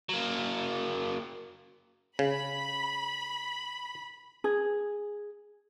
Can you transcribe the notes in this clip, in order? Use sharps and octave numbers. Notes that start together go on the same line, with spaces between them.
F#3 A#3
C#3 B5
G#4